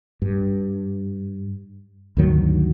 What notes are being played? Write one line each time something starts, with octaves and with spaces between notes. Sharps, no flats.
G2
D2 G2 D#3 F#3